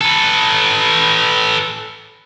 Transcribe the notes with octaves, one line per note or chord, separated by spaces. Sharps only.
A4 B4